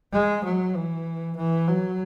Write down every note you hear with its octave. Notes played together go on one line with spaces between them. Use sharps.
G#3
F#3
E3
E3
F#3